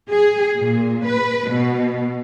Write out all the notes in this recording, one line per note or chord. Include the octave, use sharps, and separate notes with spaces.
G#4
A#2
B4
B2